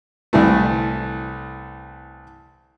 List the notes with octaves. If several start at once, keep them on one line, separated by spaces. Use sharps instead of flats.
C2 E3 A3